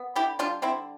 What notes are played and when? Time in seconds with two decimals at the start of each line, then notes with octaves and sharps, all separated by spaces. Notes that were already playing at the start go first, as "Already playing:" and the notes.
Already playing: B3
0.16 D3 E4 G4
0.39 G3 D4 F4
0.62 D3 C4 E4